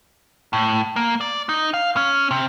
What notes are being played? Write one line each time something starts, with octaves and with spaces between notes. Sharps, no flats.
A2
A#3
D5
D#4
F5
C#4
C3